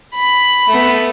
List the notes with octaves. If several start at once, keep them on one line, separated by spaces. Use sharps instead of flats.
B5
A3 B3